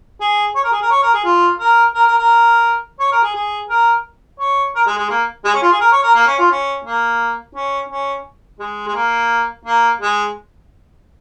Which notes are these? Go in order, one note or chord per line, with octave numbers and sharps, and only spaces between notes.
G#4
C#5
A#4
G#4
A#4
C#5
A#4
G#4
F4
A#4
A#4
A#4
A#4
C#5
A#4
G#4
G#4
A#4
C#5
A#4
G#3
G#3
A#3
G#3
C#4
F4
G#4
A#4
C#5
A#4
A#3
C#4
F4
C#4
A#3
C#4
C#4
G#3
G#3
A#3
A#3
G#3